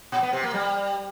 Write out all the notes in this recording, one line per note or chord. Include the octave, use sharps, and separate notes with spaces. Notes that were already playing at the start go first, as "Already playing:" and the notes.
A#2
B3
C3
A#3
G3